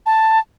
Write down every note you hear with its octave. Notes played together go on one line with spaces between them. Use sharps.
A5